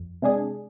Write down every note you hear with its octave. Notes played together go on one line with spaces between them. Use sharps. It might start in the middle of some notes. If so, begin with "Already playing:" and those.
Already playing: F2
C3 G#3 D4 G#4